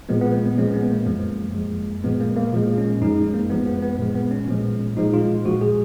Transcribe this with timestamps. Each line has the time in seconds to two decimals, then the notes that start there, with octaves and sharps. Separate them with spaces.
0.09 A#2 F3 G#3 B3
0.21 B3
0.33 A#3
0.46 B3
0.57 A#2 F3 G#3 C#4
0.74 B3
0.91 A#3
1.06 F#2 F3 G#3
1.55 F#2 F3 G#3
2.04 A#2 F3 G#3 B3
2.20 A#3
2.36 A#3
2.53 A#2 F3 G#3
2.78 C#4
3.01 F#2 F3 G#3 D#4
3.34 A#3
3.50 F#2 F3 G#3 B3
3.67 B3
3.83 B3
3.99 A#2 F3 G#3 B3
4.15 B3
4.31 C#4
4.48 A#2 F3 G#3
4.97 A#2 F3 G#3 D#4
5.14 F4
5.45 A#2 F3 G#3 F#4
5.61 G#4